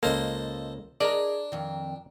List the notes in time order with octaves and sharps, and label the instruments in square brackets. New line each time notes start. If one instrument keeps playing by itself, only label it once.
[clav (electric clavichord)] C#2 A#3 [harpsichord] A4 C5 D#5
[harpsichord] D4 [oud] G#4 A#4 D#5 [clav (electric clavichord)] D5 A#5
[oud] F2 D#3